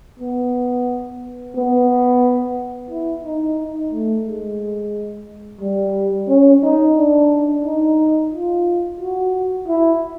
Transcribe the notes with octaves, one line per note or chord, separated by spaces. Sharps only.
B3
B3
E4
D#4
D#4
A3
G#3
G3
C#4
D#4
D4
D#4
F4
F#4
E4